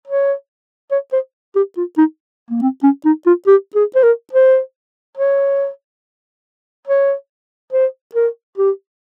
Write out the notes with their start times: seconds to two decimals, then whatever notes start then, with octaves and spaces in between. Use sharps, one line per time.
0.07 C#5
0.91 C#5
1.13 C5
1.56 G4
1.77 F4
1.98 D#4
2.50 A#3
2.62 C4
2.83 C#4
3.05 D#4
3.26 F4
3.47 G4
3.75 G#4
3.95 C5
4.03 A#4
4.33 C5
5.18 C#5
6.87 C#5
7.73 C5
8.15 A#4
8.58 G4